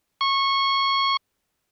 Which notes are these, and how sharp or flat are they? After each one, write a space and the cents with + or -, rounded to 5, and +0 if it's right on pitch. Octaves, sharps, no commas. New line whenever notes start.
C#6 -20